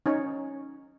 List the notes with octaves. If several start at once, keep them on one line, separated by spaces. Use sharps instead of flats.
C#4 D#4 C#5